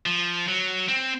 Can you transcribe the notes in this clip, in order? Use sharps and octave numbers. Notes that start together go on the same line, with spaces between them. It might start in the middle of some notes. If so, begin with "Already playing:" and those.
F3
F#3
C4